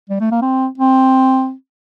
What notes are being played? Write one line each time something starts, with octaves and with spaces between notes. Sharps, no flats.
G3
A3
A#3
C4
C4